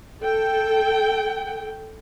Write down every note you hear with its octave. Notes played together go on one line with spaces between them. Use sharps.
A4 G5